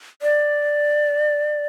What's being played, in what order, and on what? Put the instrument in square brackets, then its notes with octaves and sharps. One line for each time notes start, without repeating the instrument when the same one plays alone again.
[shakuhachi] D5